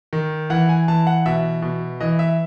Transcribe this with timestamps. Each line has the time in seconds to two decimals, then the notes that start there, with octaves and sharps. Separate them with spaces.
0.13 D#3
0.50 E3 F#5
0.69 G#5
0.88 E3 A5
1.07 F#5
1.26 B2 E5
1.62 B2
2.00 E3 D#5
2.19 E5